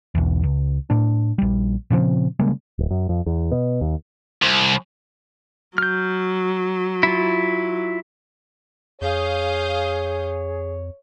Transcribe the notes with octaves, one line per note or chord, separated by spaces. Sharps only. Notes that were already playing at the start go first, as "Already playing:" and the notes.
B1 E2
C#2
A2 D4
A#1 G3
A#2 C#3 F3 C4
C#3 G3 G#3 A#3
D1
F#2
F2
E2
B2
D#2
C2
F#3 F6 G6
E4 F4
F2 G#4 C#5 F5 D#6 G6